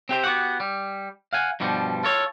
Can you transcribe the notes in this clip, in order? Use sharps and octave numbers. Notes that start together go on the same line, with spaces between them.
C4 G4 C5
B3 F#4 G4 F#5
G3
F5 F#5 G#5
G2 B2 F3 G3
F4 A4 C#5